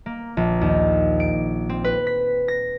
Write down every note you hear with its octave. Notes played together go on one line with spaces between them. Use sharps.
A#3
A#1
D#2
D7
C4
B4
B6
A#6